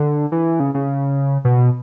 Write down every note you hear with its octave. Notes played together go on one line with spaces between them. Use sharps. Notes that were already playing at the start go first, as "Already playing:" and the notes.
Already playing: D3
E3
C#3
C#3
B2